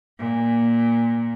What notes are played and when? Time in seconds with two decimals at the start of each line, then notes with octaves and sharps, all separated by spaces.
0.20 A#2